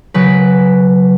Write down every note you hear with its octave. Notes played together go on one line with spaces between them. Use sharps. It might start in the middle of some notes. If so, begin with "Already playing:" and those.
C#3 F#3 B4